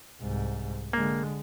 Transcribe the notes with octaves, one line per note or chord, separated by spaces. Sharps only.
C2 G#2
D3 G#3 A#3